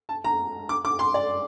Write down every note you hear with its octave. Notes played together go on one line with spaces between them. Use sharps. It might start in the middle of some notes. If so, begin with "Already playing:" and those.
A5
A#5
D6
D6
C6
D5